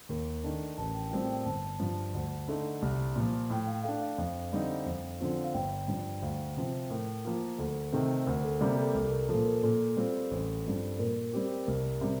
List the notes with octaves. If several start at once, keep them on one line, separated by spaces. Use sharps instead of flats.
D#2 A#4
D#3 A3 D4
A1 A5
G5
A2 G3 C4 F4 G5
G5
G1 A5
G2 F3
D2
D3 A3 D#4
C2
A#2 F3
A2 G5
F5
A3 D4 F5
F5
F2
D3 G3 C4 D#4
F2
D3 F3 C4 F4
F5
G1 G5
G2 F3
D2 F5
C3 F3 C4
A2 A#4
F3 A#3 F4
D2 A4
C3 D#3 A3 C4
D2 A#4
A4
C3 G3 A#3 A#4
A4
C2 A4
A#4
A#2 F3 A4
A#4
A#2 A4
G3 C4 F4
A1
G2 F3 C4
A#2 A#4
G3 C4 G4
C2 A#4
C3 G3